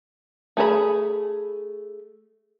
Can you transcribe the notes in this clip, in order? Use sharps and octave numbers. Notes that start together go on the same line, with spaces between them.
A3 G#4 A#4 B5